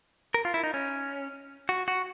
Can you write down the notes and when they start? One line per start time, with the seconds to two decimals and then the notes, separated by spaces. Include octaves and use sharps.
0.34 A#4
0.45 F4
0.54 E4
0.64 D#4
0.74 C#4
1.69 F#4
1.88 F#4